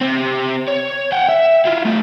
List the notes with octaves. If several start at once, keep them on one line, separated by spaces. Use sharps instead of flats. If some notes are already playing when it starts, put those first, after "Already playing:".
C3 C4
C#5
F#5 G5
E5
E4 F4
A3 D#4